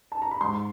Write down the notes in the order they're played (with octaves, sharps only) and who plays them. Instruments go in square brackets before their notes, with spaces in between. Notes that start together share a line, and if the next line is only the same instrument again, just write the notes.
[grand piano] A5
A#5
B5
G#2 C6